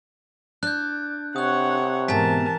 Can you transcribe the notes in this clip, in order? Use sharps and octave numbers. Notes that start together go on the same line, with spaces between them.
D4 F#6 G6
C3 C#5 F#5 D#6 F#6
G#2 B2 E3 A#4 G#5 A5 B6